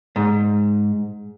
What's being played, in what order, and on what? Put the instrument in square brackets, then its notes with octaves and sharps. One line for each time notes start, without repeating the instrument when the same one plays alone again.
[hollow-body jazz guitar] G#2